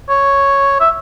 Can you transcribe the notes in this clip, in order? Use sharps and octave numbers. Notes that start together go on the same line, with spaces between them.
C#5
E5